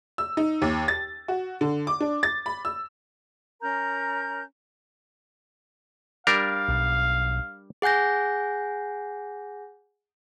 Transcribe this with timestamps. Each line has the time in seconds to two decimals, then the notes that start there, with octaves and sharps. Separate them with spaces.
0.18 E6
0.37 D#4
0.62 D#2
0.88 A6
1.28 F#4
1.61 D3
1.87 D6
2.00 D4
2.23 A6
2.46 B5
2.65 E6
3.62 C#4 A#4 A#5 G6
6.27 G3 D4 A#4 F5
6.69 B1
7.82 G#4 F#5 G#5 G6 A#6